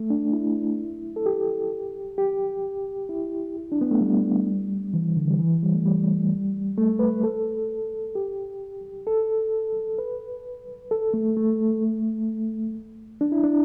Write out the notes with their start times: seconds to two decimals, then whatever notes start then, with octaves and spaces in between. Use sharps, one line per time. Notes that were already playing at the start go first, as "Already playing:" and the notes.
Already playing: A3
0.10 D4
0.33 E4
1.16 A4
1.26 G4
2.18 G4
3.09 E4
3.72 D4
3.81 B3
3.91 A3
4.01 G3
4.94 E3
5.17 D3
5.30 G3
5.39 E3
5.63 G3
5.74 A3
5.85 G3
6.77 A3
6.99 B4
7.23 A4
8.15 G4
9.07 A4
9.98 B4
10.91 A4
11.14 A3
11.37 A3
13.21 D4
13.32 E4
13.44 D4